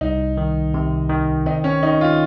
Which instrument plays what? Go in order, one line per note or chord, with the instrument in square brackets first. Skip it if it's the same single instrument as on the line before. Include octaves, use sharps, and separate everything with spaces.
[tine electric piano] C2 [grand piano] D#4
[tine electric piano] D#3
C3
D#3
[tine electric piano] C4 [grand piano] D#4
[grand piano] C#4
[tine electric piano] D#3 [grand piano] D#4
[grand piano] F4